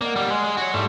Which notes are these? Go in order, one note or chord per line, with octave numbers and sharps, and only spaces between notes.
A#3 D5 D#5 F#5
G3 A#3
G#3
G#3
F#4 C#5 C6 E6 G#6
G#2 G3 A3 E4